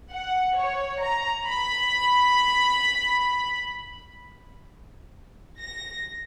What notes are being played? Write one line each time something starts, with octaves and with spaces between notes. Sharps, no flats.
F#5
C#5
A#5
B5
A#6